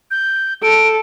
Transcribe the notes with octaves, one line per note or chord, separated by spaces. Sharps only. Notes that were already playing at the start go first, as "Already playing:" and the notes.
G6
A4 D7